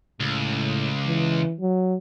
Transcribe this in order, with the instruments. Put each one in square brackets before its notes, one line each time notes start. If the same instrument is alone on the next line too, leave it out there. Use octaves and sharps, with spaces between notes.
[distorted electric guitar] C#2 [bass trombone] A2
[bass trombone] E3
F#3